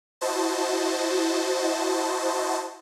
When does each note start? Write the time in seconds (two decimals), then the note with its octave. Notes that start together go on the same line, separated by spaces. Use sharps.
0.21 E4 F#4 C5 D#5 A5